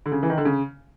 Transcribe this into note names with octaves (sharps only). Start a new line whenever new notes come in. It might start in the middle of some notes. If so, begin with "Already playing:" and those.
D3
C#3
E3
D#3
D3
C#3